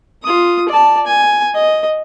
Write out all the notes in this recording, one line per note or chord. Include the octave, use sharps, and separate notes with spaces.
F4 D#6
D5 A5
G#5
D#5